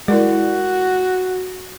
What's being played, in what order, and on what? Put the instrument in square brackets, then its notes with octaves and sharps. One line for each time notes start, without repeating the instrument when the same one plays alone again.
[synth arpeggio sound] G#3 [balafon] E4 A#4 D5 [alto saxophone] F#4